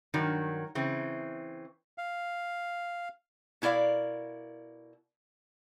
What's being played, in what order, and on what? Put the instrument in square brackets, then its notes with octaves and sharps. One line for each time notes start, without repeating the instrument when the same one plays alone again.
[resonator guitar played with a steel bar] G2 D#3 F#3
C#3 E3 C4
[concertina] F5
[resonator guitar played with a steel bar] B2 E4 A#4 D5 F5